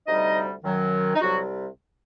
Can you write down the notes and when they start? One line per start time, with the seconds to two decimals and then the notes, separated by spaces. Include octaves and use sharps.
0.06 D2 C3 G3 D#4 D#5
0.63 F#2 D#3 F#3
1.15 D#4
1.21 C2 C3 F#3 G3 F#4